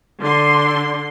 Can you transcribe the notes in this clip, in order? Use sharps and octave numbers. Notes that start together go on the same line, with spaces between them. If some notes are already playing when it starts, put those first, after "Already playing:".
D3 C6